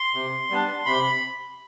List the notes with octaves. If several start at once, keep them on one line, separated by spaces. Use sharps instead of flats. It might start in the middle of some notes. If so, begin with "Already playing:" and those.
Already playing: C6
C3
G3 B3 D4
C3 B5